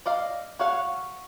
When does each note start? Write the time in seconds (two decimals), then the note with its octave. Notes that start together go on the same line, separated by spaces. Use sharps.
0.06 D5 D#5 F5
0.59 F#4 C#5 F5 F#5